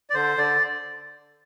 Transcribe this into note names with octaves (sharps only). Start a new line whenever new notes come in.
D5
D3 C5
D3 D5